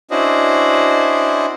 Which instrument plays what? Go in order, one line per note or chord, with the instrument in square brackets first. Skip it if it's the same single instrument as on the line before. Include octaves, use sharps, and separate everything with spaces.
[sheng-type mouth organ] C#4 D4 E4 F#4 C5 D#5